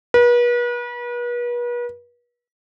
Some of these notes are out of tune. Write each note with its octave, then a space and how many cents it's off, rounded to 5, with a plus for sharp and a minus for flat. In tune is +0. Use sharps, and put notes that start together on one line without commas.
B4 -40